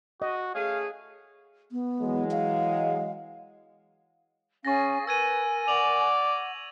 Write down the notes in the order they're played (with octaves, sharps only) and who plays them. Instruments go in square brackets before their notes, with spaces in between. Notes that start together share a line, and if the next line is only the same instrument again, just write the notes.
[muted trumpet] F#4 [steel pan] D#5
[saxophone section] A3 C#4 G#4 [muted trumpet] F5
[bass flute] B3
[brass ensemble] E3 F#3 G#3
[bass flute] F5
[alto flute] C#4 [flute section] G#4 F5 G#5 [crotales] C#6 A6 A#6
[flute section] A#4 G#5 [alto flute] B4 [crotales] E6 G#6 D#7
[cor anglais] D5 [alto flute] F#5 [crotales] F7 F#7